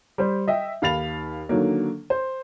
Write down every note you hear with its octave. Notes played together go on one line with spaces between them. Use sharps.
G3 C5
D#5 E5 G5
D#2 F5 B5 A6 F7
D3 D#3 F#3 A#3
C5